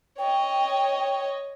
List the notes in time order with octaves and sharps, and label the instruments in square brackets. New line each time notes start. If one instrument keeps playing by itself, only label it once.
[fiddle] C#5 D#5 [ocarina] G5